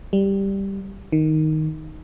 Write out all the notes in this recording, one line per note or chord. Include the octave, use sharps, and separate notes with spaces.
G3
D#3